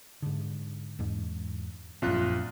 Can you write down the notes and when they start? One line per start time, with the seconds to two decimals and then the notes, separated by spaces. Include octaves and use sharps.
0.22 G#2 D3
0.99 E2 G#2
2.02 A#1 F#2 C4 F4 F#6